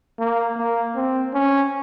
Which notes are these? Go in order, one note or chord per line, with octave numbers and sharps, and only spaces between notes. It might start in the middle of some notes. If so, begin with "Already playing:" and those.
A#3
A#3
C4
C#4